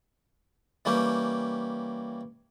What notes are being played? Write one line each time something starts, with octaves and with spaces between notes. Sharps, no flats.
E3 G3 A#3 C#4 G4